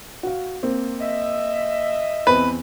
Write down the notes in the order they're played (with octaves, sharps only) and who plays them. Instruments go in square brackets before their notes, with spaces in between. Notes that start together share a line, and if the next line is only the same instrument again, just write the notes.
[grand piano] F#4 F5
A#3 C4
[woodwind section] D#5 E5
[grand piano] E2 C4 [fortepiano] B4